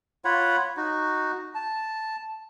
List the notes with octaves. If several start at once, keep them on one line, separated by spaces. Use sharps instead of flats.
F4 C#5 F#5 B5
D#4 F#4
A5